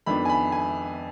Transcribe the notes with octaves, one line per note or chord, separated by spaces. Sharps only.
F2 D#3 B3 D4 B5
G#5
B5
G#5